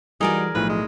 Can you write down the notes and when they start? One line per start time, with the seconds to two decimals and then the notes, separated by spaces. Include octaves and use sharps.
0.21 E3 G3 D#4 F#4 G#4 A#4 D5 G#5
0.55 B1 A2 F3 B4
0.69 G#3